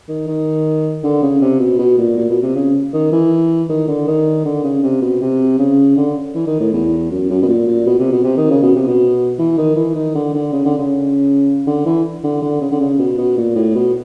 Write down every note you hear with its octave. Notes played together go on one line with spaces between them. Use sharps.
D#3
D#3
D3
C#3
C3
B2
B2
A#2
A#2
B2
C3
C#3
D#3
E3
D#3
D3
D#3
D3
C#3
C3
B2
C3
C#3
D3
E3
D#3
A2
E2
F#2
F#2
B2
A#2
A#2
B2
C3
B2
C3
D#3
C#3
B2
C3
B2
E3
D#3
E3
D#3
D3
D3
C#3
D3
C#3
D3
E3
D3
D3
C#3
D3
C#3
B2
B2
A#2
A2
B2